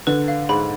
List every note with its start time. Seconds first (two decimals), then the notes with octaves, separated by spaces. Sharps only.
0.07 D3 B4
0.28 F5
0.49 G#2 B5